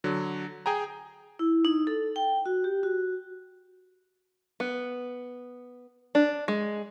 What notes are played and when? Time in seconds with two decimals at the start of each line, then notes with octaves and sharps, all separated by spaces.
0.04 D3 F#3
0.66 G#4 G5 G#5 A#5
1.39 E4
1.65 D#4
1.87 A4
2.16 G5
2.46 F#4
2.64 G4
2.83 F#4
4.60 B3
6.15 D4
6.48 G#3